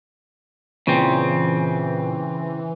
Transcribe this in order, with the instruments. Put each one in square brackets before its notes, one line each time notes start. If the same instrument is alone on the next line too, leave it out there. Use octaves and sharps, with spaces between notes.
[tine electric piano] A#2 [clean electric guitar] C#3 C4 [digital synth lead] E3